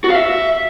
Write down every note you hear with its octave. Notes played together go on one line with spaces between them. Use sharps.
F#4
F5
E5